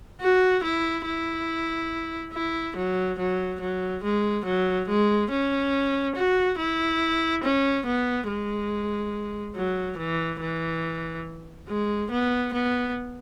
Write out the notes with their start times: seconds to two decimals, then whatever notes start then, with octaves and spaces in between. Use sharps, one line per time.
0.21 F#4
0.63 E4
1.05 E4
2.33 E4
2.76 F#3
3.18 F#3
3.61 F#3
4.03 G#3
4.45 F#3
4.88 G#3
5.30 C#4
6.15 F#4
6.58 E4
7.43 C#4
7.86 B3
8.28 G#3
9.56 F#3
9.98 E3
10.40 E3
11.68 G#3
12.11 B3
12.53 B3